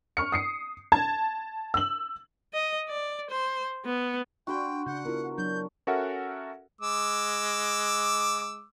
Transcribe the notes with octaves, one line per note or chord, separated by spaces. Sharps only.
C#6 F6 C#7
D#6 C7 C#7
A5 G#6
E6 F#7
D#5
D5
C5
B3
D4 F#4 G5 B5 C6
C#3 D4 F#5 G6
B3 E4 F4 A#4
F#3 D4 G6
C#4 F#4 A4 A#4 E5 F#5
G#3 D6 E6